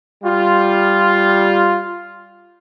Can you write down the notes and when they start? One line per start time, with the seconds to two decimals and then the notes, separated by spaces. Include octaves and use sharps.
0.24 G3 F4